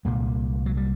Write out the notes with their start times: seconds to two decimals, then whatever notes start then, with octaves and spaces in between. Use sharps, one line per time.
0.05 C2 A#2 G#3
0.66 F#3
0.77 G3